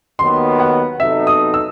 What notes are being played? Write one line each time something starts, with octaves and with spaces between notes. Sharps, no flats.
D#2 D#3 F#3 B3 C6
F#5
C3 F#3 B3 D#4 A4 E5
D#6
E6